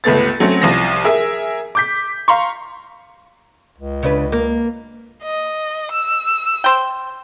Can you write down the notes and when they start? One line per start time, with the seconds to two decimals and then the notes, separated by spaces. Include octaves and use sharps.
0.04 G1 C#2 A3 B3 A6
0.40 F#3 A3 C4 C#4
0.62 C2 F3 A#6
1.04 G#4 A#4 E5
1.75 D6 G6 B6
2.28 F5 A#5 C6 C#6
3.78 C#2
4.03 C#3 D4 B4
4.32 A#3
5.24 D#5
5.92 E6
6.64 C5 G5